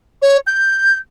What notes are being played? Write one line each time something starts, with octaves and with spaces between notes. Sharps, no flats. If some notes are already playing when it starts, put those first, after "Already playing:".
C#5
G6